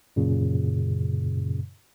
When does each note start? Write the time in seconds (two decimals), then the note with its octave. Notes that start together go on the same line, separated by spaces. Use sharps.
0.16 F#2 A#2 C#3